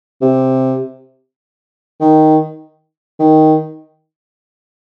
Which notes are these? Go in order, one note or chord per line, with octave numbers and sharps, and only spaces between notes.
C3
D#3
D#3